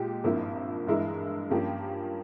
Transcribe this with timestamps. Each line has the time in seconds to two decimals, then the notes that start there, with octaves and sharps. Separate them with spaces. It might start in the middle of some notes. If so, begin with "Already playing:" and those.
Already playing: A#2 G#3 G4
0.24 G#1 G2 F3 A#3 E4
0.87 G2 E3 G#3 E4 A#4
1.50 G2 F3 A#3 C#4 G4